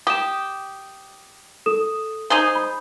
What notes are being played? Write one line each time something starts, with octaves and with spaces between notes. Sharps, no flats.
G4 D#6 E7
A4 D#6 E7
D#4 G#4 C5
B5